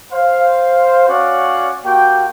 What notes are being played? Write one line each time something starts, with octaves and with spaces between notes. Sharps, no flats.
C5 F5
C#4 F#4 C#5 D5 F5 F#5
A#3 F#4 G4 G5